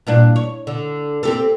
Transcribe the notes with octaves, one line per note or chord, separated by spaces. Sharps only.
G2 A#2 D4
C#5
D3
C4 G4 A4